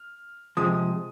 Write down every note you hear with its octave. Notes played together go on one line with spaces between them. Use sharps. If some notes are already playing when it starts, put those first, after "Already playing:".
Already playing: F6
C3 F3 G#3 D#6